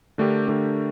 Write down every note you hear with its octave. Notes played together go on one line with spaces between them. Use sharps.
D3 A3 D4 G4 A#4
D3 A3 D4 G4 A#4